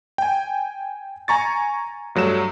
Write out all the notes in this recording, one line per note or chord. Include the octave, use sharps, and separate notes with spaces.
G5 G#5
G#5 A#5 C#6 A6
G2 F#3 A3 E7